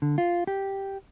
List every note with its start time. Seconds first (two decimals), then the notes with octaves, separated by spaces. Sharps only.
0.02 D3
0.18 F4
0.47 G4